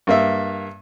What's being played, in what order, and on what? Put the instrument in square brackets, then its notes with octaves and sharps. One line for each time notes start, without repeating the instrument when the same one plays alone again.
[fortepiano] G2 A#3 E5